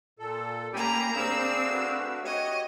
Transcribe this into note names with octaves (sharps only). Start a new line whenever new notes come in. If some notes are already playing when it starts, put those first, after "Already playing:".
A#2 A4
A#3 C#4 G4 G5 G#5 A#5 B5
C4 D4 G#4 F5 B5 E6
A3 F#4 B4
F#4 G4 C#5 D#5